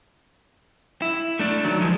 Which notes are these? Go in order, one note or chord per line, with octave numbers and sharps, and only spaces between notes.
E4
A3 D4
D#3 F#3
F3 G#3